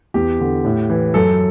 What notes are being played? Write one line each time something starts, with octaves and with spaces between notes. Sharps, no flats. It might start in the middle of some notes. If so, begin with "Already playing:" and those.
E2 G4
D3
A2
E3
F#2 A4